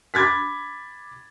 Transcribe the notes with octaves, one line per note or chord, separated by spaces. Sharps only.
B5 D6 G#6 A6 B6